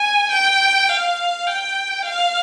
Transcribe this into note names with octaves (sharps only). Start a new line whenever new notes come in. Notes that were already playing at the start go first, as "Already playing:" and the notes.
Already playing: G#5
G5
F5
G5
F5